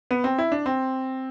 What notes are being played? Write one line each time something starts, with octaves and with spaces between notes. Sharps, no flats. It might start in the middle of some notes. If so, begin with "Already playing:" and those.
B3
C4
E4
D4
C4